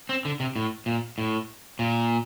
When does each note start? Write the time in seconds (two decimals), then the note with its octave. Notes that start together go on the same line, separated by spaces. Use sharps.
0.09 C4
0.25 D3
0.40 C3
0.56 A2
0.86 A#2
1.18 A2
1.79 A#2